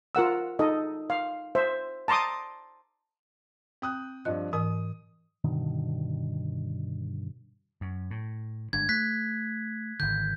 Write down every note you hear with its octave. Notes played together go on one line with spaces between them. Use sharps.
F4 A#4 F#5 E6
D#4 A4 D#5
F5
C5 E5
A5 A#5 C6 D6 D#6
C4 G5 D#6 F#6
G2 F3 D#5 F#6
G#2 E3 A#4 D#6
G2 B2 D3 D#3
F#2
A2
G1 G#3 D4 G#6
A3 F#6 B6
G#1 D3 G6